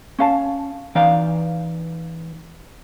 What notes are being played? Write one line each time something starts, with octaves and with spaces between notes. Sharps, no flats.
C#4 F5 A5
E3 D#4 D5 F5